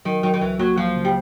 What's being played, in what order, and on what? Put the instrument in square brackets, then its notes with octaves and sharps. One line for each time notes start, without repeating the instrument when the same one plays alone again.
[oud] D#3 [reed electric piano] F#3
[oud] D#3 [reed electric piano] F#3
[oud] D#3
[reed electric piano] C#2 [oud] E3
[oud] F#3 [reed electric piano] A#3
[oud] F3 [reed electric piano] F#3
[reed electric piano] C#3
[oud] G3